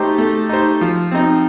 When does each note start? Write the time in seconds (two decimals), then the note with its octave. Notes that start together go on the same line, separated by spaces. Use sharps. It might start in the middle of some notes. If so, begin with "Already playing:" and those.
Already playing: A3 D#4 G4 C5
0.18 A3
0.49 D#4 G4 C5
0.81 F3
1.11 C4 D#4